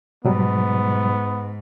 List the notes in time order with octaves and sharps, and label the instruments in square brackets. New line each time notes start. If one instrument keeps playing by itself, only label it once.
[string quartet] G#2 [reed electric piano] B2 F#3 G3 [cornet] B3